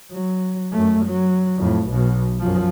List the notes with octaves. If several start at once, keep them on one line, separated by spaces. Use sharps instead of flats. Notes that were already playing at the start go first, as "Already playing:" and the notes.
F#3
F#2 A3
F#3
F2 A2
B1 B2
F#2 F3